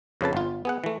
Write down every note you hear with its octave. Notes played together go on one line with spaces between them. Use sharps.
F2 C#3 B4 A5
G1 F4
B3 G#4 F#5
E3 A3